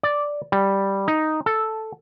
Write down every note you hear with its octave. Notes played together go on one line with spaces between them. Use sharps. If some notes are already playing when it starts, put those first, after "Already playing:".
D5
G3
D#4
A4